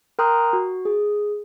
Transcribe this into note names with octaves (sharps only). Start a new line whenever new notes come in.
A#4 G5 A#5 C6 D#6 F#6
F#4
G#4